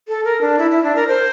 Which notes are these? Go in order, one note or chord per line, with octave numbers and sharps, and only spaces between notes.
A4
A#4
D4
E4
E4
D4
A#4
C5